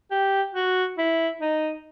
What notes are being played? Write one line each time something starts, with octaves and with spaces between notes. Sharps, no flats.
G4
F#4
E4
D#4